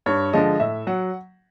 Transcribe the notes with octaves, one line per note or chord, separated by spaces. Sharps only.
G2 C#5
D3 F3 G#3 D#5
A2 E5
F#3 F#5